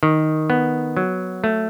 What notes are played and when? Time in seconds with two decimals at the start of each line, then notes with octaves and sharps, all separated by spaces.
0.03 D#3
0.50 B3
0.97 F#3
1.44 A3